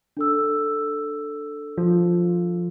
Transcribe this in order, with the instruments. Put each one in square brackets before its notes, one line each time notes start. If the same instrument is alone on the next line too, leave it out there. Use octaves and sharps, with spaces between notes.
[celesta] D4 A4 E6
[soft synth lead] F3